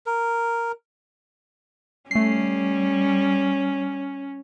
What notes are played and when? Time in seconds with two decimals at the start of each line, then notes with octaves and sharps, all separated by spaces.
0.06 A#4
2.11 G3 A3 C#4 C7